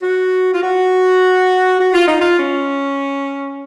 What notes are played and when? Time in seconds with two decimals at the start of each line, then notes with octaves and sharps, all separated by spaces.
0.02 F#4
0.54 F4
0.62 F#4
1.80 F#4
1.93 F4
2.07 D#4
2.20 F4
2.39 C#4